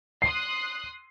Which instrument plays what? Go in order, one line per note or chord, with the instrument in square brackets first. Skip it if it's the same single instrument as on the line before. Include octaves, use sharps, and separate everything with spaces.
[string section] C6 D#6 F#6 [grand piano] C7